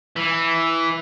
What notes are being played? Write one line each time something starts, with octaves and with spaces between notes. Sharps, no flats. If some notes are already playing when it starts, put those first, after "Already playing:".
E3